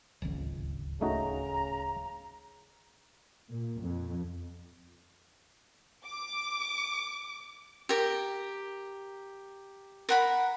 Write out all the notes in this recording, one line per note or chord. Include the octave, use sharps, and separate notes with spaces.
D1 G#1 C#2
C#3 A3 D#4 F#4 A#5
A#2
F2
D6
G4 A#4
A#4 F#5 B5